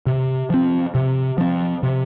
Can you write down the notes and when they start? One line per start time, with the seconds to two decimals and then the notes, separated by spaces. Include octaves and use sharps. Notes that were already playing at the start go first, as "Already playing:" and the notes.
0.06 C3
0.50 F3 C4
0.95 C3
1.38 F3 C4
1.83 C3